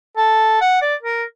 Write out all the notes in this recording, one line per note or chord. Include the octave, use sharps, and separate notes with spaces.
A4
F#5
D5
A#4